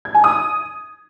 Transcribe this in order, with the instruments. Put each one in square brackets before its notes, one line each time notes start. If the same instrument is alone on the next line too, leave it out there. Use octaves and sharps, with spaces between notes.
[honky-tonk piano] G#6
G#5
D#6